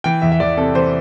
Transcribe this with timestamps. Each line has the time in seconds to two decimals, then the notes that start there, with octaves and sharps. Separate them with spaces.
0.04 E3 G5
0.22 E2 E5
0.32 E5
0.40 E2 D5
0.57 C3 A4
0.75 E3 C5